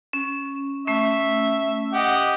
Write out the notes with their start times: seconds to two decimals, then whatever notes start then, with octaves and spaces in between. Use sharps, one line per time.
0.13 C#4
0.87 A3 C#4 E5
1.94 G4 D#5 F#5